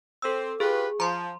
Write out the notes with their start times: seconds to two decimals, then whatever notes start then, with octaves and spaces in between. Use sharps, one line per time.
0.22 C4 A4 E6
0.60 F4 G4 G#4 B4
1.00 F3 A#5 C6